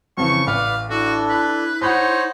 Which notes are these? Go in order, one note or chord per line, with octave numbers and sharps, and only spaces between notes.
F2 C#3 E3 C#6
A1 B4 D5 F5 B5
D4 E4 F#4 A4
B4
D#4 C5 C#5 F#5 B5 C6